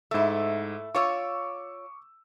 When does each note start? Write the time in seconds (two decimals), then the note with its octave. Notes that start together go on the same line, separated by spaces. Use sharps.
0.11 G#2 A3 E4 E6
0.95 F4 C#5 C#6 D6 E6